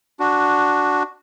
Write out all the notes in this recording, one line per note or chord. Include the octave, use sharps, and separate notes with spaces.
D4 F#4